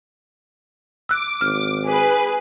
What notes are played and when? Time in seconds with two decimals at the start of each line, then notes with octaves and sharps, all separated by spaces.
1.09 D6 E6 F#6
1.41 G#1 F6
1.86 G#4 B4